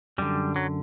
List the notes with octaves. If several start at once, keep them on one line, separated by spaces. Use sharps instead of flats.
F#2 D3 G3
F#3